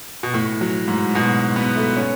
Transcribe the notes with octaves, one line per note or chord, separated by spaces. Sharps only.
B2
A2
F#3
G#2
B2
B3
A3
C#4